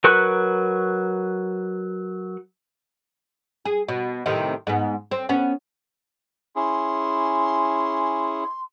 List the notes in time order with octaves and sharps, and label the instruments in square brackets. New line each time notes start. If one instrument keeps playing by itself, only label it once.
[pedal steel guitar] F#3 A#4 B4 C#6 F#6
[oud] G#4
B2
A2 C3 D#3
G#2 B3
C4
B3 C#4
[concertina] C#4 E4 G#4 [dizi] C6